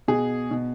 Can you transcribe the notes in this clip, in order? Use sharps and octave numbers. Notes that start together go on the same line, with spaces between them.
B2 G#4
B2